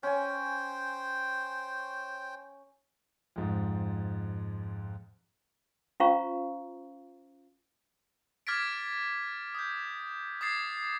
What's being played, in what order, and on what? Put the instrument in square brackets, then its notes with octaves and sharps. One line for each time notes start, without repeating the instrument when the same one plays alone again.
[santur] C#4 G#5 [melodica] C5 G5
[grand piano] F2 G#2
[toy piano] C#4 F4 C5 F5 A#5 C#6
[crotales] D6 F6 G#6 A6 B6 D7
D#6 G6
D6 D#6 G#6 A6 C7